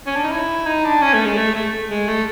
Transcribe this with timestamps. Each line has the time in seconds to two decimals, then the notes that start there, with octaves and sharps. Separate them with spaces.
0.07 C#4
0.16 D4
0.23 D#4
0.32 E4
0.67 D#4
0.85 D4
1.02 C#4
1.14 A3
1.25 G#3
1.37 A3
1.55 A3
1.90 G#3
2.08 A3